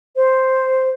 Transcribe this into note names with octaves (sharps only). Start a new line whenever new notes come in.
C5